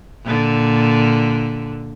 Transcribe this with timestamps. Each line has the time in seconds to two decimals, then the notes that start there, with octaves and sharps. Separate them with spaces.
0.24 A#2 D3